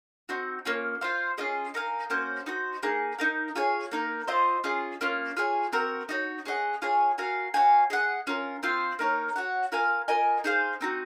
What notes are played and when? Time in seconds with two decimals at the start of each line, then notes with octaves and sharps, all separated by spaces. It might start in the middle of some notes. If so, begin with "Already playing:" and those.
0.29 C4 D#4 F#4
0.65 A#3 C#4 F4
1.01 F4 C5 F5
1.38 C#4 F4 G#4 D#5
1.74 D#4 A#4 F5 G#5
2.10 A#3 C#4 F#4 C5
2.46 D#4 F#4 C5
2.83 A#3 D#4 G#4
3.19 D#4 A#4 F5
3.56 F4 G#4 C#5 G#5
3.91 A#3 D#4 A#4
4.27 C4 F4 C5 D#5
4.64 C#4 F4 G#4 D#5
5.01 A#3 C#4 F4
5.37 F4 G#4 C#5 G#5
5.73 C4 F#4 A#4
6.09 D#4 F#4 C#5
6.45 C#4 G#4 D#5 F#5
6.82 F4 G#4 C#5 G#5
7.18 F#4 A#4 F5 G#5
7.54 F#4 C#5 F5 G#5
7.90 G#4 D#5 F#5
8.27 C#4 F4 A#4
8.63 C4 F4 C5 F5
8.99 A#3 D#4 A#4 C#5
9.36 F#4 C#5 F#5
9.72 F4 A#4 F5 G#5
10.08 F4 A#4 D#5 G#5
10.44 D#4 G#4 C5 F5
10.81 C4 D#4 F#4